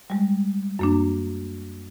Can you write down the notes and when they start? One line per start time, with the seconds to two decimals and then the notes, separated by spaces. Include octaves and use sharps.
0.10 G3 G#3
0.79 F#2 A#3 D4